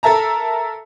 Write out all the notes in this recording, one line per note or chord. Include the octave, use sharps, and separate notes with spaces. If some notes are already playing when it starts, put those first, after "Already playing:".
A4 A#4 E5 A5 A#5